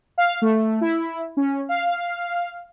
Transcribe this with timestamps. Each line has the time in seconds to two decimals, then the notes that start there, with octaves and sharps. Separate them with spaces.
0.18 F5
0.42 A3
0.81 E4
1.37 C#4
1.69 F5